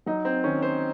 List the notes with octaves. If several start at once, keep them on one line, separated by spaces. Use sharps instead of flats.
F#3 D#4
C4
D#3 C#4
C5